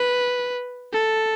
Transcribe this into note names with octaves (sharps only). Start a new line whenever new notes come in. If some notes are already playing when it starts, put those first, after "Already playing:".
Already playing: B4
A4